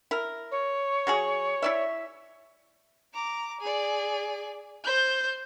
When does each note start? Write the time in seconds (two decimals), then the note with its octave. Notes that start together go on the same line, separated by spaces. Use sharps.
0.11 E4 A#4
0.51 C#5
1.07 F#3 F#4 G#4
1.62 E4 D5 E5
3.14 A#5 D6
3.61 G#4 D5
4.84 C5 G6